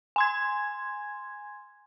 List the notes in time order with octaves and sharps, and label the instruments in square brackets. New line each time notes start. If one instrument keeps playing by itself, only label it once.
[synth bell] G#5 C6 G#6